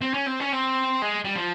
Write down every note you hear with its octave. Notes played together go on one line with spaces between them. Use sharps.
C4
C#4
C4
C#4
C4
G#3
G3
F3